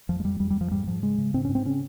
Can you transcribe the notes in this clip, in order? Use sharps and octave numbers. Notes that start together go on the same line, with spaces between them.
F2 F3
G#3
F2 G3
F2 G3
G3
F2 F3
G#2 G3
G#2 F3
C#3 G#3
C#3
G#2 C4
C#4
G#2
C4
C#3 C#4